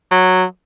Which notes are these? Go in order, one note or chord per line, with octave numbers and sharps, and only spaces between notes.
F#3